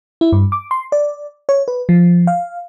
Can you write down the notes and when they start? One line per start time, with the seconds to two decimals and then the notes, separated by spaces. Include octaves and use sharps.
0.21 E4
0.32 G2
0.52 D6
0.71 C6
0.92 D5
1.49 C#5
1.68 B4
1.89 F3
2.27 F5